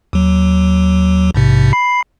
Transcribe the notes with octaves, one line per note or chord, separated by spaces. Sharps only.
D#2 F#3
A#1 G#2 C3
B5 C7